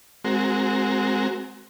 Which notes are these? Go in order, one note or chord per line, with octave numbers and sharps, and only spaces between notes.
G#3 C4 F#4 A#4